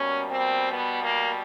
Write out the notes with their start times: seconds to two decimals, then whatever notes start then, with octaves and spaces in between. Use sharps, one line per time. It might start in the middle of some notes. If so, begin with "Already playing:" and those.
Already playing: B2 G3 A#3 C#4
0.30 C4
0.73 B3
1.03 A#3